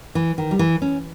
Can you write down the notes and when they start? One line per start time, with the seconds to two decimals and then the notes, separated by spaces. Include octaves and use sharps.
0.15 E3
0.38 D#3
0.51 G3
0.59 E3
0.82 C#4